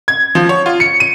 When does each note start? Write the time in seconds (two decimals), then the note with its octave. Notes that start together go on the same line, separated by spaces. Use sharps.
0.08 G#6
0.35 F3
0.49 C#5
0.66 F4
0.80 C#7
1.00 D#7